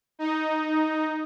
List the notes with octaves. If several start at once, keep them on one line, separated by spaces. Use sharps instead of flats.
D#4